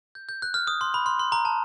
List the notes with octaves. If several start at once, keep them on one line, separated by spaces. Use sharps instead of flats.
G6
G6
F#6
F6
D#6
C6
B5
C6
C6
A#5
A5